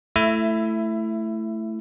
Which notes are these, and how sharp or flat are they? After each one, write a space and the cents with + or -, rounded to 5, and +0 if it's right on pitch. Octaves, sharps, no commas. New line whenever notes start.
A3 +0 E4 +10 E5 +25